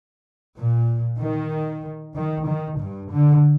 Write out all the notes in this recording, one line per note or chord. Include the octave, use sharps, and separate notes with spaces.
A#2
D#3
D#3
D#3
G2
D3